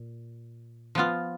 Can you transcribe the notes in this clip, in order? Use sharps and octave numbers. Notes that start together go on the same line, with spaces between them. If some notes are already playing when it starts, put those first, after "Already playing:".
Already playing: A#2
F3 B3 F4